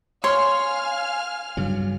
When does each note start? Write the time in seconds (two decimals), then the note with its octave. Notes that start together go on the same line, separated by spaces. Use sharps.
0.24 C#5 F5 G#5 C6 F6
1.57 G2 C#3 F#3